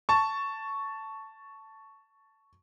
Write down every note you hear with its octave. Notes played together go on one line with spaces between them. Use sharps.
A5 C#6